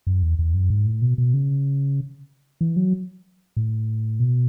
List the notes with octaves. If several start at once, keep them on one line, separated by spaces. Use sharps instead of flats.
F#2
E2
E2
F#2
G#2
A2
B2
B2
C#3
E3
F#3
A2
B2